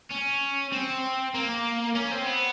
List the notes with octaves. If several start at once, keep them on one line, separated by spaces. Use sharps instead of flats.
C#4
C4
A#3
C#4
C4
B3